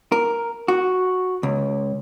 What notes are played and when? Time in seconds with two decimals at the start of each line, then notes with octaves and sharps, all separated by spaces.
0.12 A#4
0.68 F#4
1.43 C#2